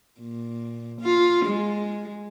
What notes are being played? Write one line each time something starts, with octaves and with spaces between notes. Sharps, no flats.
A#2
F4
G#3